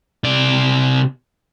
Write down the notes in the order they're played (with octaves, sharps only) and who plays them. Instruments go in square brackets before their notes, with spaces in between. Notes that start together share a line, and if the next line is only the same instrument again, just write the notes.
[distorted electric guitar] C3 D5